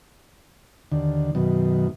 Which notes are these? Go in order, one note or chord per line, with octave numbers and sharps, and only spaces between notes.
D#2 D3
F#2 B2 D#3